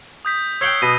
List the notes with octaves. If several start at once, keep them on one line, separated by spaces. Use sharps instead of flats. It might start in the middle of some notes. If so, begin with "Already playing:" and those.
D#6 G6 B6
C#5 F#5 G5 E6 C7 G7
B2 A#6 B6 D#7